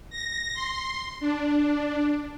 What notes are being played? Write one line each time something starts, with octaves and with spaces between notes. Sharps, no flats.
A#6
C6
D4